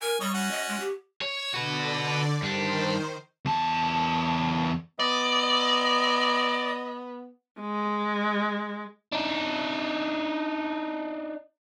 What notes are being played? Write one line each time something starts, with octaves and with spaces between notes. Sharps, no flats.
A#4 G#5
G3 C#5 D#5
C#4 F#4
D#5
G#3
G4
C#5 G#6 E7
D3 F#4 B4 D5
G2 D#3 D4 C5
E2 A5
B3 D5 D#5
G#3
D4 D#4